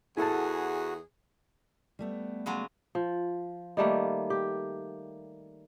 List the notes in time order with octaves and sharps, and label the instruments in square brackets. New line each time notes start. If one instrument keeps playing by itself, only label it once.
[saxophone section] E2 G#4 [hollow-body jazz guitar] E4 A4 A5 [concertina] F#4
[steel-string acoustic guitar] G3 A3 B3
[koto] C#3 F#3 G#3
[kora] F3
D#3 G3 A3 A#3
G4